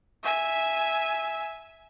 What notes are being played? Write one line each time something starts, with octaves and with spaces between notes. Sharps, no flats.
E5 G#5